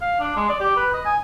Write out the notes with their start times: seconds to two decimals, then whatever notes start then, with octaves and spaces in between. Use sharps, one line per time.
0.02 F5
0.20 D4
0.36 G#3
0.49 D5
0.60 G4
0.77 B4
0.93 D#5
1.05 G#5